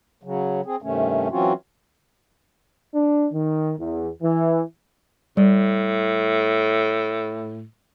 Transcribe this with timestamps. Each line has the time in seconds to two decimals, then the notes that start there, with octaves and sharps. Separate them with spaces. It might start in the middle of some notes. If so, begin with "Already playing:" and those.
0.23 C#3 F#3
0.66 C4 G#4
0.82 G2 C3 D#3 A3 C#4
1.30 E3 F#3 C4 C#4 F4 F#4
2.94 D4
3.33 D#3
3.80 E2
4.23 E3
5.37 A2 G3